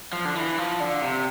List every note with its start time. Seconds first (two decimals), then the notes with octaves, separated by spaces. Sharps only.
0.13 F3
0.25 D3
0.35 E3
0.58 F3
0.80 D3
1.02 C3